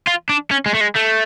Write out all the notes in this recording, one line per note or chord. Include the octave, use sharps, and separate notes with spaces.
F4
D4
C#4
G#3
A3
G#3
A3